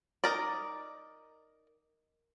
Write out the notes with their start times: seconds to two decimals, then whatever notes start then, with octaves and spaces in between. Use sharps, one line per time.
0.24 D#4 A#4 D5